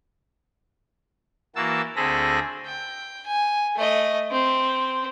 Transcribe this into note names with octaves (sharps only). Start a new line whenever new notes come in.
E3 A#3 F#4 A5 E6
D2 C4 G#4 A4 B5 A#6
G5
G#5
A3 D#5
C4